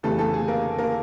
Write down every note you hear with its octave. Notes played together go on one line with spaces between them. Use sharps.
F2 C#3 E3 G3 A3 A4
A3 A4
G#4
A#3 A#4
A#3 A#4